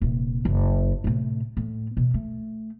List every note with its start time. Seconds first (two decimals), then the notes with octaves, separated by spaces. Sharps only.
0.01 D#1 C3
0.45 F#1
1.04 A2 C3
1.57 A2
1.97 B2
2.14 A3